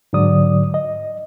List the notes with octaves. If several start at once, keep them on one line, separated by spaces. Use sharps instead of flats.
G#2 D3 F#3 D5 D#6
D#5